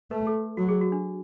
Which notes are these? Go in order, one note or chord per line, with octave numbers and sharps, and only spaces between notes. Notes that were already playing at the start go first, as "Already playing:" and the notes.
A3 B4
A4
F#3 F#4
G#4
F#4
D4